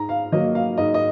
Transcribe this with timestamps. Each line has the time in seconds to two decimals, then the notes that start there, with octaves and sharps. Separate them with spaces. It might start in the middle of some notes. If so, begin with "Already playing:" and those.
Already playing: G#2 A#5
0.09 F5
0.32 F#3 A#3 D#5
0.55 F5
0.78 G#2 D#5
0.94 D#5